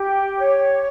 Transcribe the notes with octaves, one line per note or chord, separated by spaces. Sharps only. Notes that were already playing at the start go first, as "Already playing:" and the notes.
Already playing: G4
C#5